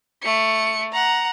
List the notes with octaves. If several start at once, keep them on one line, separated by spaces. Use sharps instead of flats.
A3 C#7
F#5 A#5